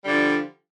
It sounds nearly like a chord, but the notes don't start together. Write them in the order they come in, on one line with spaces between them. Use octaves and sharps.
G3 D3 F3